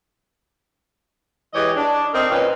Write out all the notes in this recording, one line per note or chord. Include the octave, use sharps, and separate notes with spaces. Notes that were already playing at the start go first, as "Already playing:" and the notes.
E3 G#3 G4 C#5 D#5
D4
C4 D#4 A#4
A#2 C#4 F4 B4 C#5 D#5